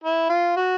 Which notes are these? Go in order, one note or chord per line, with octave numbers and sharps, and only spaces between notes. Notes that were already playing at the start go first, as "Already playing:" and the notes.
E4
F4
F#4